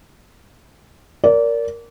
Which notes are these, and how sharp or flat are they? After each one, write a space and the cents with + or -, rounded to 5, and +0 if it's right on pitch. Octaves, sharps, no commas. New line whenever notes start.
A#4 +0 D5 -25